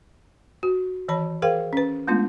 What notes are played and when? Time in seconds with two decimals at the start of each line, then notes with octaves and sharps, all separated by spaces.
0.63 F#4
1.08 D#3 E3 C#5 A5 B5
1.42 G#4 A#4 C5 F5 G5
1.73 C#4 B4
2.08 G#3 A3 B3 D4 F4